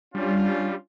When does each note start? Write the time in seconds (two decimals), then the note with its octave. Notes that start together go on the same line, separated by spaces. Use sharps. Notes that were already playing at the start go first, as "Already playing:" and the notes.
0.14 G3 C#4 D4 F4